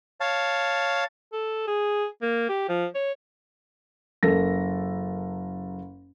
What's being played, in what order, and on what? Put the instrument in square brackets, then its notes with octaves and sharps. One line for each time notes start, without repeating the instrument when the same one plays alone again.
[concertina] C#5 F5 A5
[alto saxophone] A4
G#4
A#3
G4
F3
C#5
[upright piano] F#1 A4 A#4 A#6